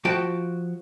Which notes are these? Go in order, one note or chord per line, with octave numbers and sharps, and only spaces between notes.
F3 F#4 G5 A5